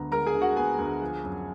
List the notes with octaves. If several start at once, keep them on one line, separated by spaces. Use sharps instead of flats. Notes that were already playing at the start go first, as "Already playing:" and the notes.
Already playing: D2 D3 G#3 B3 A#5
G#3 A#4 A#5
G#4 G#5
D3
F#4 F#5
B3 G#4 G#5
D2
F3
F#2